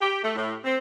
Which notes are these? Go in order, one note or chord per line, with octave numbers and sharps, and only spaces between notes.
G4
A3
A2
C4